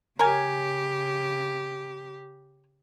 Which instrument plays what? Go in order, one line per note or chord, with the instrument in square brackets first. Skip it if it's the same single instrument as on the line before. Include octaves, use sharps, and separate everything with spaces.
[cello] C#3 G4 [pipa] A#4 C#5 G#5